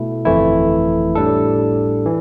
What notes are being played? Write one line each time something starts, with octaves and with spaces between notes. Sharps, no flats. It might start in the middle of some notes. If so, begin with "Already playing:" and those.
Already playing: B2 A3 E4
G1 F2 E3 A3 E4
A2 G3 D4 A4
E3